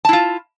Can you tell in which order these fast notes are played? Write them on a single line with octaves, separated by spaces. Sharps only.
A5 E4 F4